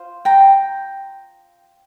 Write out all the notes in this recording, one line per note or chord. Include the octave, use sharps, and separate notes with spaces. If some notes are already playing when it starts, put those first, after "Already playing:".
Already playing: F4 C5
G5 A#5